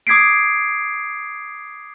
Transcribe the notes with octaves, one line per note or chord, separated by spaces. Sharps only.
D6 D#6 G#6 B6 C7 D7